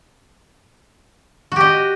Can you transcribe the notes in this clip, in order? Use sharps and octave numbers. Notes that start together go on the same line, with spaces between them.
F#4 G4 D#5